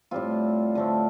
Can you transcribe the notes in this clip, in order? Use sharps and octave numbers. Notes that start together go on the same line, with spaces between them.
A2 G3 C4 F4
D3 A3 C4